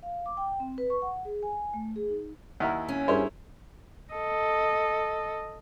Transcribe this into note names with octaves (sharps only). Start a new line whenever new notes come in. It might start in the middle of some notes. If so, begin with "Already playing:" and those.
F5
D6
G5
C4
B4
C#6
F#5
G#4
G#5
A3
G#4
D#4
D#2 E4 F#5 A#5 F6
C#4
G2 E4 G#4 A#4 C5 C#5
A4 D#5